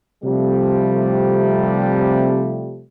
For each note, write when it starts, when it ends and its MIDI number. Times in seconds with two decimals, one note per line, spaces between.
0.24 2.83 48
0.24 2.83 53
0.24 2.83 55
0.24 2.83 57